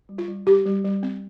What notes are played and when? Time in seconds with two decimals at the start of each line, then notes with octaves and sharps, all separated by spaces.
0.09 G3
0.18 F4
0.28 G3
0.46 G3 G4
0.65 G3
0.84 G3
1.03 C4